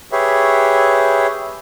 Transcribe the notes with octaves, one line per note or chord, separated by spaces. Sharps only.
G4 G#4 B4 C#5 E5